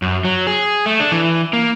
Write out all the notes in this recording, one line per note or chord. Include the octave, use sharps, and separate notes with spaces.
F#2
F#3
G#4
A3
D4
E3
A#3